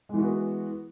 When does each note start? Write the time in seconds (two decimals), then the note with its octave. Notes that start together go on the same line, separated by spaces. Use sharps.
0.09 G#3
0.14 E3
0.19 F#4
0.23 B3